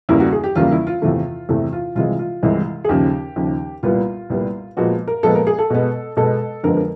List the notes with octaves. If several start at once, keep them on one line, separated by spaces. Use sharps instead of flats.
E2 C#3 E3 G3 A#3 E4
F#4
G#4
G4
E2 C#3 E3 G3 A#3 F4
E4
F4
E2 C3 E3 A3 F4
E2 C3 E3 A3
F4
C2 C3 E3 G#3 F4
F4
C2 C3 E3 G#3
G#4
D#2 C#3 F3 G4
D#2 C#3 F3
C2 A#2 G3 B3 F4
C2 A#2 G3 B3
A#2 F3 G#3 B3 F#4
A#4
A#2 F3 G#3 B3 A4
A#4
G#4
A4
B2 G#3 B3
B2 G#3 B3 A4
F2 D3 F3 G#3 B3 A#4
A#4